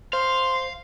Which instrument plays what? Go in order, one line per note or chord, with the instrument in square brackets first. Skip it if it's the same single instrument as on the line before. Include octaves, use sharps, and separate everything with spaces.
[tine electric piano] C5 [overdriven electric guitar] F5 [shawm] C6